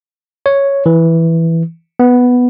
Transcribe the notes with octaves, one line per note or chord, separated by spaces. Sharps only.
C#5
E3
B3